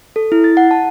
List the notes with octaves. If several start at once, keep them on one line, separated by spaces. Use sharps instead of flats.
A4
E4
A6
F#5
A5